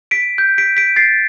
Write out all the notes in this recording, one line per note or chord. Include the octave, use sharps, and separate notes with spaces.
B6 D7
G6
B6 D7
B6 D7
A6 C7